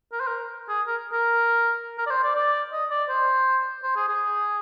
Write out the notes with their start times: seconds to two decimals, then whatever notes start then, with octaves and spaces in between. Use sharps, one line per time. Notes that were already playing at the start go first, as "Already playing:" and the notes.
0.12 A#4
0.21 C5
0.27 A#4
0.69 G#4
0.87 A#4
1.12 A#4
1.98 A#4
2.07 D5
2.10 C5
2.23 D5
2.35 D5
2.72 D#5
2.91 D5
3.09 C5
3.83 C5
3.96 G#4
4.09 G#4